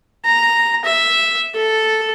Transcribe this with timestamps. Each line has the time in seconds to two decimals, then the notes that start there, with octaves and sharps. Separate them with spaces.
0.25 A#5
0.85 E5
1.55 A4